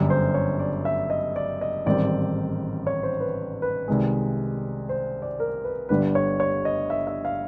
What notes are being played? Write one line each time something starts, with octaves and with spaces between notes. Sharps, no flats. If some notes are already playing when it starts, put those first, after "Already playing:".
Already playing: G1 F#2 D3 G3
C5
C#5
D5
E5
D#5
D5
D#5
A1 G#2 D#3 G3 C4 D5
C#5
C5
B4
B4
C2 C3 D#3 G#3
C5
D5
A#4
B4
G1 G2 D3 G3 B4
C#5
C#5
D#5
E5
E5
F5